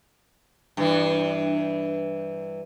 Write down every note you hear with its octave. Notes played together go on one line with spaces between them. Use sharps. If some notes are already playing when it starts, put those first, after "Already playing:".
G2 E3